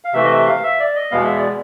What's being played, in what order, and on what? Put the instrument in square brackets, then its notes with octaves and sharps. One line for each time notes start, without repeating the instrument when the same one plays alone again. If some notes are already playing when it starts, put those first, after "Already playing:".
[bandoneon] F5
C3 E3 A3 E5
D#5
E5
F5
E5
D5
D#5
E2 B2 G#3 B3 F5
E5
D5